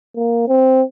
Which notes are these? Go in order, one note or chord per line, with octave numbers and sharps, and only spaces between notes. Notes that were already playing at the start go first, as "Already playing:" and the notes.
A#3
C4